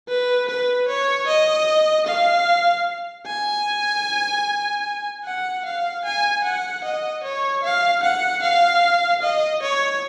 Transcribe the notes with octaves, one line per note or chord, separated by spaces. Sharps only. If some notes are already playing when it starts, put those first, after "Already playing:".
B4
B4
C#5
D#5
F5
G#5
F#5
F5
G#5
F#5
D#5
C#5
F5
F#5
F5
D#5
C#5